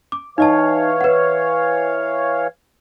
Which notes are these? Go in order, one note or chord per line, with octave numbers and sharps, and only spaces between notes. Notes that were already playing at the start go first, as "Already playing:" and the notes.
D6
E3 D#4 C#5 D#5 F5 A5
B4 F#5